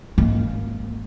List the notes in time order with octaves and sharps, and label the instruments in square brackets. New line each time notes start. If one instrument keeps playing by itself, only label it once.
[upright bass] G#1 A#3